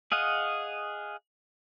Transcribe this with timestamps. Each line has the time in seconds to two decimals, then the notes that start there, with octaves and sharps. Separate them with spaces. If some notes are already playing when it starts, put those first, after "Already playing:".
0.12 G#4 D#5 F5 F#5